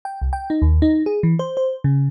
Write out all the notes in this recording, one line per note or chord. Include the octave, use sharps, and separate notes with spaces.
G5
C2
G5
D#4
D#2
D#4
G#4
E3
C5
C5
C#3